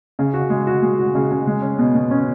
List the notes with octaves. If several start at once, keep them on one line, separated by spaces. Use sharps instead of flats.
C#3
F#4
G#3
F#4
G#3
F#4
C#3
C#3
G#3
C#4
B2
B2
C#4